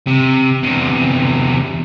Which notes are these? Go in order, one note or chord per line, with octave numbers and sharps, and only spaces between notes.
C3
E2 C3